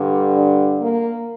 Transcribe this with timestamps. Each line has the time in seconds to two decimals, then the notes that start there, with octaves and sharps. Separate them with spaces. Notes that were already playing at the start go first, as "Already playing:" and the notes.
Already playing: G2 D3
0.35 D4
0.79 A#3